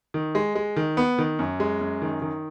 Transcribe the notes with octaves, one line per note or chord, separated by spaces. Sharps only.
D#3
G#3
G#3
D#3
B3
D#3
F#2
G#3
F#2
D#3
D#3